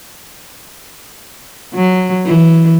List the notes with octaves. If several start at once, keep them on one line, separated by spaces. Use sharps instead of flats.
F#3
E3